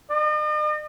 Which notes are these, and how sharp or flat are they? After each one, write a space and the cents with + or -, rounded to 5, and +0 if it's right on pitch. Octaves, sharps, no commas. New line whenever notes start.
D#5 -45